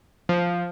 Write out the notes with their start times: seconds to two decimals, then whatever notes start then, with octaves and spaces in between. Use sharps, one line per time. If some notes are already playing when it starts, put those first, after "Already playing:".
0.29 F3